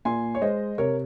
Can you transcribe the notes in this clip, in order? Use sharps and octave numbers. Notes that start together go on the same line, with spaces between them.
A#2 G#5 C6
C#5
G#3 C5 D#5
C3 A#4 C#5